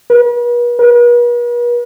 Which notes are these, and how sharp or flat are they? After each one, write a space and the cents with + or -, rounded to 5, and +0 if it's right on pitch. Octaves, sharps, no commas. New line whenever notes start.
B4 -45
B4 -45